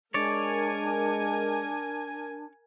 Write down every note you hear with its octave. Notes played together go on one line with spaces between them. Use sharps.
G#3 D4 A#4 C#5 D5 G#5